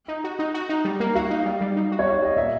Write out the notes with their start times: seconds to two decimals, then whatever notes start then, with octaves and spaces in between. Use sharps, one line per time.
0.08 D#4
0.24 F#4
0.39 D#4
0.54 F#4
0.69 D#4
0.85 G3
1.00 A#3
1.15 F#4 F5
1.30 D#4
1.45 G3
1.61 G3
1.76 D#4
1.92 F#4
1.99 C#5
2.06 G3 D5
2.22 G3 D#5
2.36 A#2 E5